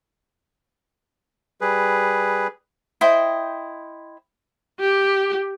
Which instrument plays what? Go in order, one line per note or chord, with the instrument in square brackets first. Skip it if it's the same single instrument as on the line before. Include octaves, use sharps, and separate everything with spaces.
[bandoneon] G3 G#4 B4
[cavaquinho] E4 C5 D#5 G5
[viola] G4